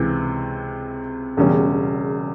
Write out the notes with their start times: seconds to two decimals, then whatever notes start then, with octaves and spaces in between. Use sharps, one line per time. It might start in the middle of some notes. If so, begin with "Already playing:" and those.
Already playing: C#2 C3 E3
1.37 E1 E2 C#3 G3 C#4